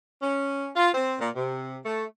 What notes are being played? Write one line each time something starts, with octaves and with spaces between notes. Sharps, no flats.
C#4
F4
C4
A#2
C3
A3